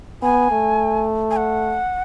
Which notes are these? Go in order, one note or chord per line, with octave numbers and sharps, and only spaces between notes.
B3 G#5
A3
G#5
F#5